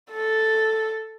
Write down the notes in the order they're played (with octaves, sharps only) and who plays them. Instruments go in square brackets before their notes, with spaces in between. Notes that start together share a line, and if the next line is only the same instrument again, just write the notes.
[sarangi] A4